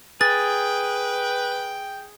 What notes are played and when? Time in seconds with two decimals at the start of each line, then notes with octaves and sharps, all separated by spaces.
0.21 G#4 B4 G5 A6